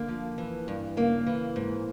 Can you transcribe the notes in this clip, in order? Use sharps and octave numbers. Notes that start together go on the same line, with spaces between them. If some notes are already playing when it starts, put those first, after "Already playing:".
Already playing: D3 A#3
F3
E3
G2
C#3 A#3
E3
G#2